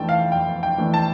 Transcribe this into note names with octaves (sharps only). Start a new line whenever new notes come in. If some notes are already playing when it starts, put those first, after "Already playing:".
Already playing: F2 E3 A3 D4 G5 A5
F5
F2 G5
G5
E3 A3 D4
A5